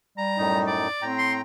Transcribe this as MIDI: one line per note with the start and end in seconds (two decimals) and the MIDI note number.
0.18 0.82 55
0.18 0.60 82
0.38 0.88 42
0.38 0.88 45
0.38 0.88 63
0.67 1.05 74
1.02 1.41 45
1.02 1.41 60
1.02 1.41 79
1.02 1.41 82
1.18 1.33 84